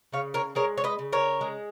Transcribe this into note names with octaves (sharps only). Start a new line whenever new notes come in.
C#3 C#5 F5
A#4 C#5
G#3 A#4 C#5
C#5
B4 D#5
C#3
A#4 C#5
G#3